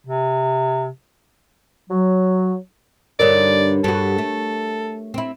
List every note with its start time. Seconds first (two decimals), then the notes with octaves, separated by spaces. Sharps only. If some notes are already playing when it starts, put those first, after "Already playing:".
0.07 C3
1.89 F#3
3.20 G2 D3 D#4 A#4 C#5 D5
3.84 G2 F#4 A4
4.18 A3
5.14 C4 E4